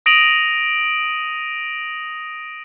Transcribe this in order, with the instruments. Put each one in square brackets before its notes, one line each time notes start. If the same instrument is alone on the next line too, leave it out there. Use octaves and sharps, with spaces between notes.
[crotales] D#6 A#6 D7 D#7 F7 F#7